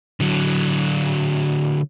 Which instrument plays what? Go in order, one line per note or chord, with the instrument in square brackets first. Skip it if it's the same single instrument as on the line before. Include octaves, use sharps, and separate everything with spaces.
[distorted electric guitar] D3 F#3